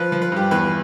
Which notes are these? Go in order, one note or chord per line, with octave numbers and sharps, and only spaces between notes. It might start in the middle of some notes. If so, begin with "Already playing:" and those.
Already playing: F3 B4
F3
B4
G2 G4
E2 B4